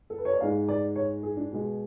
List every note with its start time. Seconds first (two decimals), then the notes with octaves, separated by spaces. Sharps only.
0.10 A4
0.18 B4
0.25 C#5
0.33 D5
0.40 G#2 G#3 F5
0.69 D5
0.96 C#5
1.23 G#4
1.37 D4
1.52 B2 G#3